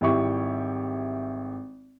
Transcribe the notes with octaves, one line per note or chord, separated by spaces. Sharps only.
G#1 G3 E4 G4 C#6